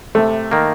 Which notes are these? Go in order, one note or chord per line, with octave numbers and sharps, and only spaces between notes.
C3 A3
D#3 A#3